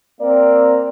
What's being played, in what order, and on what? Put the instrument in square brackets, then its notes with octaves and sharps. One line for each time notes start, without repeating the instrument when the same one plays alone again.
[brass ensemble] A#3 C4 A#4 D5